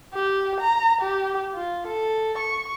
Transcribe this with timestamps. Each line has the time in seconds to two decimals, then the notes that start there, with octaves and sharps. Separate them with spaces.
0.14 G4
0.60 A#5
1.01 G4
1.54 F4
1.87 A4
2.38 C#6